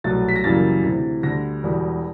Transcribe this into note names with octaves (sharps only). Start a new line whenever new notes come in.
C2 B2 F#3 A3 A6
B6
A#6
F#2 C#3 E3 G3 A#3 A6
D2 C3 E3
D2 D3 G3 A#6
E1 E2 B2 G3